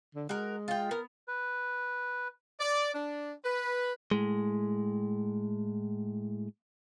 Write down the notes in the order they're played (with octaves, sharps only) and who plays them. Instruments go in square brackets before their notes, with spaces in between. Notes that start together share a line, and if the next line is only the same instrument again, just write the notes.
[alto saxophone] D3
[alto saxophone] G#3 [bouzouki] F#4 A#4
[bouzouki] F4 G5
[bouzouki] B3 [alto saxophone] A#4
[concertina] B4
[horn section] D5
D4
B4
[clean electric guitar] A2 G#3